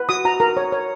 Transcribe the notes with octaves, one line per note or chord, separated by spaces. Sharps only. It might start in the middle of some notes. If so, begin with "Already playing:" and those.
Already playing: B4
F#4 D#6
F#4 A#5
A#4 A#5
C#5
C#5